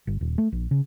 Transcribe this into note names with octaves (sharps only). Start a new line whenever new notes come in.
G1
D#1
A3
A#1
C#3